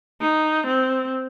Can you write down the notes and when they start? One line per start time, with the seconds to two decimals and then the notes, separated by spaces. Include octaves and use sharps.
0.21 D#4
0.67 C4